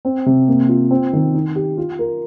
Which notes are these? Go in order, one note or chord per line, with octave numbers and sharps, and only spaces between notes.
C4
C3
A#3
F4
C4
D#3
D#4
G4
F4
A#4